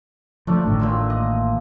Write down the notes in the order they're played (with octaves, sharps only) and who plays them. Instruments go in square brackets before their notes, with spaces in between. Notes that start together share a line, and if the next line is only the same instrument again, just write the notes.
[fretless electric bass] F3 [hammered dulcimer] A3 D4
[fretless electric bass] A1 A2 D#3
[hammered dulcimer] A#2 F4 E5
D#5